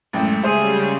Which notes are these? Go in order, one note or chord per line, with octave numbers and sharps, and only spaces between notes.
A1 F#2 G#3 A3 G5
C#3 G3 G#4 C5 E5 D#6